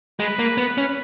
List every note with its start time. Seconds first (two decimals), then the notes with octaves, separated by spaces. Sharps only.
0.20 G#3 B4
0.39 A#3
0.58 B3
0.78 C#4